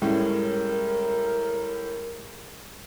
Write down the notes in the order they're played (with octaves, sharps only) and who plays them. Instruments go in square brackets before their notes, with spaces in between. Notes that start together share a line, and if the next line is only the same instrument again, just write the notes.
[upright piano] A2 [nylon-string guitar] G3 G#3 C#4 [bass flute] A#4